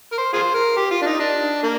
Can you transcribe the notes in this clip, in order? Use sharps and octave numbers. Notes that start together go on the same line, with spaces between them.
A#4
C5
F4 G#4 C5
A#4
G4
F4
D4
D#4
D4
A#3